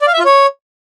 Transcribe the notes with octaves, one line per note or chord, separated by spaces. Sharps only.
D5
F5
E5
F4
C#5